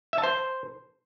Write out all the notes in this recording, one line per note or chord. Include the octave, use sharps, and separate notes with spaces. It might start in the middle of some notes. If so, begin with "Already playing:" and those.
E5
A5
C5